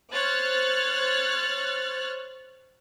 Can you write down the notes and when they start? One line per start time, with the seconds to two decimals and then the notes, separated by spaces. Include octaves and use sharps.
0.11 C5 C#5 F6 F#6 A6